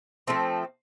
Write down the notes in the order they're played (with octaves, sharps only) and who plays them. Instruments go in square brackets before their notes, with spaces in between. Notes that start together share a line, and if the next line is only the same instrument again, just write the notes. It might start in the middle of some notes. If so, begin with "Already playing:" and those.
[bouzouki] F3 A3 C4